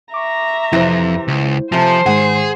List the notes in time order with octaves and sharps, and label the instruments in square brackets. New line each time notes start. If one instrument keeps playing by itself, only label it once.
[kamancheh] E5 A#5 [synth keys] C#6 D6
[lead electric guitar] F2 [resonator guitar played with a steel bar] C3 E3 [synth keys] E4 C5
[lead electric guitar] C#2
[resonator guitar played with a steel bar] C3 A3 [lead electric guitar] F3 [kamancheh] C5 [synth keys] G#5 A#5
[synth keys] G#2 D#3 G#3 [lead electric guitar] G#4 [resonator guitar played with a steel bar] F#5